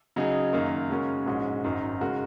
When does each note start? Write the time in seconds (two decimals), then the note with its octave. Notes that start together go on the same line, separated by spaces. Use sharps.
0.16 C#3 F#3 D#4 G#4
0.53 F#2 D#3 A#3
0.90 C#3 G#3 C#4 F#4 A#4
1.26 A#1 G#2 G#3 C#4 F#4
1.64 G#1 F#2 D#3
2.01 C#3 G#3 F#4 A#4